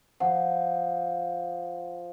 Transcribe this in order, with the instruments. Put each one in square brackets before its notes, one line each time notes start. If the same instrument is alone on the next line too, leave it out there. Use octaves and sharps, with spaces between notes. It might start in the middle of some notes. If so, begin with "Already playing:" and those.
[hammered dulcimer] F3 [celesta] F#5